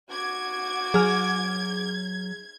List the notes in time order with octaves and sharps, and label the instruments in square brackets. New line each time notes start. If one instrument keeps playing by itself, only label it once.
[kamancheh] F#4 D6 [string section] G#6
[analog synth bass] F#3 [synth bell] G#4 F6